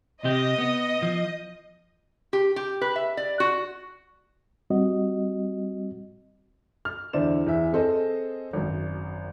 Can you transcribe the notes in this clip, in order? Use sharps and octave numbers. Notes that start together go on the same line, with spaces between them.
C3 G4 D#5
B3
F3
G4
G4
B4
E5
D5
F#4
G3 C4 F#4 D#5
F6
E2 D3 E4 C5 D5 E7
E2 E3 E5
C4 G#4 A4 C5 D#5
G#1 F#2